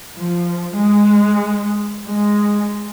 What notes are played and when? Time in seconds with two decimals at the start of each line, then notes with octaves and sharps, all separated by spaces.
0.18 F3
0.76 G#3
2.05 G#3